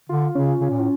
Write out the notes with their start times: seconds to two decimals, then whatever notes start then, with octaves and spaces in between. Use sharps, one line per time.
0.09 D3 F4
0.35 C#3 C#4
0.61 C#3 C#4
0.70 A#2
0.79 A2